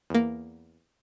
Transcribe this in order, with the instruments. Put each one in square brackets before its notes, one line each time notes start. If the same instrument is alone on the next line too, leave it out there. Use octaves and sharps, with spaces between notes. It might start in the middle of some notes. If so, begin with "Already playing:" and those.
[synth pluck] E2 A#3